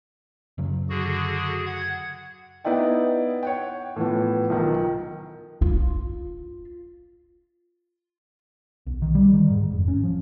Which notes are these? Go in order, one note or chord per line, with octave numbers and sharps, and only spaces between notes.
F#2 C#3 F#3
D3 F#4 G#4
F#5 G#6
B3 D#4 E4 D5 G5
C#5 F#5 G5
A2 E3 F3 B3
B1 D#3 F3 A#4
F4
B1
D#3
G3
D#3
G#2
F1
C#4
F3